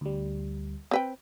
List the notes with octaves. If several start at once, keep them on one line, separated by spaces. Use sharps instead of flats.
D2 G3
C4 B4 G5